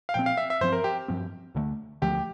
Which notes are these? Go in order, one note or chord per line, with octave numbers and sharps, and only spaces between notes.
F5
A#2 F3 C4 G5
F5
E5
E5
G2 F3 C4 C5
A#4
G4
G2 F3 C4
D2 D3 F3 A3
D2 D3 F3 A3 G4